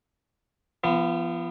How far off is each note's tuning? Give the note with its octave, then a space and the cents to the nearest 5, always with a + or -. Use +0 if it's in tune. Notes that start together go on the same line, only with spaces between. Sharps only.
F3 -35 B3 +0